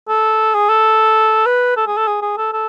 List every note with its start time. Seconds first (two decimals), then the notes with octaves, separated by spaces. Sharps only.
0.08 A4
0.55 G#4
0.69 A4
1.46 B4
1.77 A4
1.87 G#4
1.97 A4
2.07 G#4
2.22 G#4
2.37 A4
2.53 A4